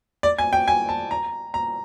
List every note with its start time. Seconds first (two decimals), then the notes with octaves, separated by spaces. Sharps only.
0.23 D5
0.38 G#5
0.53 G5
0.68 G#5
0.89 A5
1.11 A#5
1.54 A#5